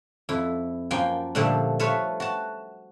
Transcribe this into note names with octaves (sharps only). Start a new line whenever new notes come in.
F2 E4
F#2 F3 A#3 G5 G#5
A#2 D3 F3 G3 A3
A3 F4 B4 C#5
F#4 A5